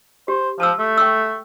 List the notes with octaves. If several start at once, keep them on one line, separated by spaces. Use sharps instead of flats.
G4 C5
F3 A5 E6
A3
G5 C#6 E6